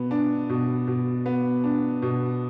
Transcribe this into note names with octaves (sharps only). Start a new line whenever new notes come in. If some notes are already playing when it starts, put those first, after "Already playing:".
Already playing: B2 B3
D4
B2
B2
B3
D4
B2